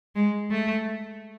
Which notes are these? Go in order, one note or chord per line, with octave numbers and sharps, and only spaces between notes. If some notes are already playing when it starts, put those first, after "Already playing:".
G#3
A3